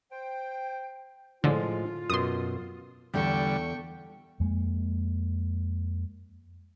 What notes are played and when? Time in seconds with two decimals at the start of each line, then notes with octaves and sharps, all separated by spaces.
0.12 C5 G5
1.44 A2 D3 F3 G#3 F4
2.10 F#2 B2 C6 D#6
3.14 E2 D3 G3 A4 G5 C#6
4.40 F2 G#3 A#3